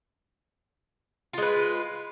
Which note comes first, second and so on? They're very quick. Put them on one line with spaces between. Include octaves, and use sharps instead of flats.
F4 G#3 B4